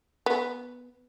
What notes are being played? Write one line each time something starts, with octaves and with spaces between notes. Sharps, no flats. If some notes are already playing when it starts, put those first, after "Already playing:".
B3